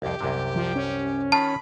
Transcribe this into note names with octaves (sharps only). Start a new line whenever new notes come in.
C2 F2 G4
C2 F#2 C3
F3
C#4
D#3 F4 A5 B5